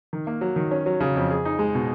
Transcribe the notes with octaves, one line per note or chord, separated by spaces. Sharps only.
D#3
A#3
F#3
D#3
C#4
F#3
C#3
F2
G#4
D#4
G#3
B2